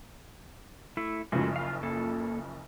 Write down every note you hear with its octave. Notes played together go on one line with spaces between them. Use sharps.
A3 E4
F#1 C#3 F3 G#3 A3 F#4
F4 F5
A#3 A4